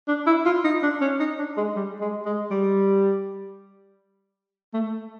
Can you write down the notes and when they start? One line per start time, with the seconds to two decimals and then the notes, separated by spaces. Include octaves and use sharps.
0.08 D4
0.27 E4
0.46 F4
0.64 D#4
0.83 D4
1.01 C#4
1.20 D#4
1.39 D4
1.57 G#3
1.76 G3
2.01 G#3
2.25 G#3
2.51 G3
4.74 A3